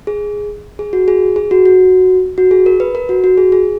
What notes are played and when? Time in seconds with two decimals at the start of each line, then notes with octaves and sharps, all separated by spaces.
0.07 G#4
0.79 G#4
0.93 F#4
1.08 G#4
1.36 G#4
1.51 F#4
1.66 F#4
2.38 F#4
2.51 G#4
2.66 A#4
2.80 B4
2.95 A#4
3.09 F#4
3.24 F#4
3.38 G#4
3.52 G#4